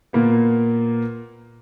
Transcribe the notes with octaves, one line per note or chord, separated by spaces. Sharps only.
A#2 A#3 B3